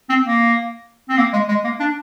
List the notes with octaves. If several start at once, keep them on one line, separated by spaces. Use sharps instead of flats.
C4
A#3
C4
A#3
G#3
G#3
A#3
D4